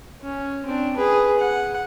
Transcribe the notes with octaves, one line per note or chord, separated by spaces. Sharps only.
C#4
C4 D4
G#4 B4
F#5